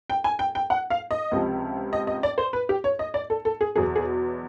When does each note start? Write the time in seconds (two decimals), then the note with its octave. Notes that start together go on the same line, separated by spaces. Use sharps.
0.10 G5
0.24 G#5
0.39 G5
0.55 G5
0.70 F#5
0.90 F5
1.11 D#5
1.31 C#2 C3 F3
1.93 D#5
2.07 D#5
2.23 D5
2.38 C5
2.53 B4
2.69 G4
2.84 C#5
2.99 D#5
3.14 D5
3.30 A4
3.45 A4
3.61 G#4
3.76 E2 B2 F#3 G#4
3.96 G#4